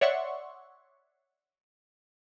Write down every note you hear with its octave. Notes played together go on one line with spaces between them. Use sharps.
C#5 D5 E5 F#5 C6 C#6